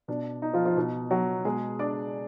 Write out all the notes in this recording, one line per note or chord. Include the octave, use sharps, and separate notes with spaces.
B2 D4
D#4
F3 F4
F3 F4
B2 D#4
F#3 F#4
B2 G#3 G#4
D4 D5